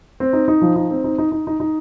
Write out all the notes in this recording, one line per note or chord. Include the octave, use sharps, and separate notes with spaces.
C4
D#4
D#4
F3
D#4
C4
D#4
D#4
D#4
D#4
D#4